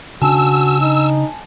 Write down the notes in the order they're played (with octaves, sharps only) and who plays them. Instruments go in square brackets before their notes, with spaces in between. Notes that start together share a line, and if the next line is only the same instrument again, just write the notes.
[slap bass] C#3 D4 [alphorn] F#4 [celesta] G#5 A5 [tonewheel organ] E6
[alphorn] D#4